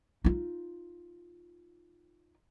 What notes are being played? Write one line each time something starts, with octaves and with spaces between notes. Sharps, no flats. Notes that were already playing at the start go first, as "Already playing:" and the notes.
D#4 F4